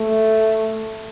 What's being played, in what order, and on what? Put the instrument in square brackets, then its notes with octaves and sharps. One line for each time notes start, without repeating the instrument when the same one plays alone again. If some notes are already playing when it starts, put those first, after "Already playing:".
Already playing: [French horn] A3